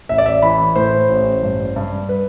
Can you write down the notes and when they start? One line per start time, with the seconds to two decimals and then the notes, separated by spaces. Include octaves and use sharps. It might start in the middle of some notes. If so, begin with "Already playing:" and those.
0.09 A1 E5
0.18 D5
0.26 E5
0.43 E3 B5
0.76 A2 C5
1.09 A1
1.43 G2
1.76 G2
2.09 B4